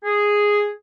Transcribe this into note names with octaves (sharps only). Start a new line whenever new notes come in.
G#4